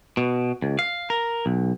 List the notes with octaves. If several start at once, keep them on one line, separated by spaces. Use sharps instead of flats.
B2
C#2
F5
A#4
B1